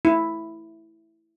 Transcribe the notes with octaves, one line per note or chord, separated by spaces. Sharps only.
E4